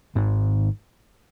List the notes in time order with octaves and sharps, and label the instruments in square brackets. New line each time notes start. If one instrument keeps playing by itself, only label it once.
[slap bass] G#1 G#2